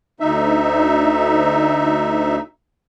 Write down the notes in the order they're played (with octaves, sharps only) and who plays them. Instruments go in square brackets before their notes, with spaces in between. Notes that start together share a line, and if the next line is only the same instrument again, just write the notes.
[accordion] D2 D#4 E5